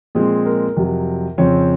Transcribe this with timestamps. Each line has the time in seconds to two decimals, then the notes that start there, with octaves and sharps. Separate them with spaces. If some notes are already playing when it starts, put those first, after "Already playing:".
0.15 A#2 F3 G#3 C4 G#4
0.46 A#4
0.76 F2 C3 F#3
1.38 F2 C#3 F3 C4 C#5